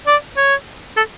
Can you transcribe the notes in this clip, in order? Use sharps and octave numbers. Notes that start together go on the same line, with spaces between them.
D5
C#5
A4